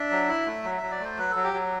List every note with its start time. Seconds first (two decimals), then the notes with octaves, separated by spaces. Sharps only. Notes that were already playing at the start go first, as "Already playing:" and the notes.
Already playing: D4 E5
0.11 F#3
0.29 E4
0.46 A3
0.64 F#3
0.78 F#3 E5
0.91 D5
1.00 A3 C5
1.18 F#3 B4
1.30 F#3 A4
1.44 G4
1.53 F#3